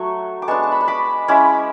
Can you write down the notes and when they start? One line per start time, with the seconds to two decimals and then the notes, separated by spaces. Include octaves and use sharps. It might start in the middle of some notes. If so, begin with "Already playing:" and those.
Already playing: F#3 A3 C#6
0.42 D6
0.48 G#3 B3 D4 A5 C#6
0.63 A5
0.72 B5
0.81 C#6
0.88 B5 D6
1.28 G#3 C#4 E4 B5 D6